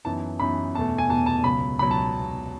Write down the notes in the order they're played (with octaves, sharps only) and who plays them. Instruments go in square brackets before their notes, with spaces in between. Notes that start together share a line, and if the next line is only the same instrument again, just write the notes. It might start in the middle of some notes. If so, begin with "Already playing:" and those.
[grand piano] F#2 E3 B3 D#4 A5
F#2 E3 B3 D#4 B5
E2 B2 A3 A5
G#5
E2 B2 A3 A5
A5
C#2 B2 F#3 B5
C#2 B2 F#3 B5
A5